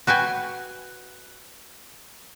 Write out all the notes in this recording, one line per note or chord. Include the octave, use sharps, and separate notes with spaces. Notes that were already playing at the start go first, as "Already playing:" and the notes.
F#4 B4 G5 G#5